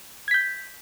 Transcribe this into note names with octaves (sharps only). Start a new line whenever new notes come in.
G6 G#6 B6